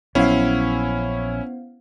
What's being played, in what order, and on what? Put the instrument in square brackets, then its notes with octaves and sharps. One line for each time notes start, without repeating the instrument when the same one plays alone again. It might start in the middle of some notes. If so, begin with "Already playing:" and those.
[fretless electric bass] A#1 F#3 [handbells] B3 C5 F5 [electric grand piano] C#4 E4